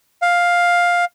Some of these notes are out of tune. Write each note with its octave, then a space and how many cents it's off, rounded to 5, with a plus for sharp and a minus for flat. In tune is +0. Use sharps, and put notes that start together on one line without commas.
F5 +10